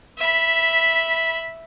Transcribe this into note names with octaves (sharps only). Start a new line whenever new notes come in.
E5 B5